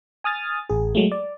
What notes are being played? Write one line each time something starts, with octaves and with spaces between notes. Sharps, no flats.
G#5 D#6 F6 A6
A1 G#4
F#3 G#3 A3
D5